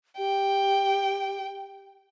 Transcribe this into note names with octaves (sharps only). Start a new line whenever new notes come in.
G4 G5